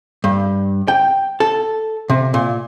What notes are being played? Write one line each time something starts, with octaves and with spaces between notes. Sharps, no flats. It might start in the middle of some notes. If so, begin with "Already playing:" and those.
G2
G5
A4
C3
A#2